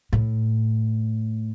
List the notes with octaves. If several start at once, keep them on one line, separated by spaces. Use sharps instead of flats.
A2